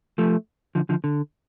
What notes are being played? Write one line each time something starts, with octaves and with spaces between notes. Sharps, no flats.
F3 A3
D3 F3
D3 F3
D3